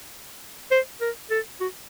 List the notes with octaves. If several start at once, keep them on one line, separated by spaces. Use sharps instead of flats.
C5
A#4
A4
F#4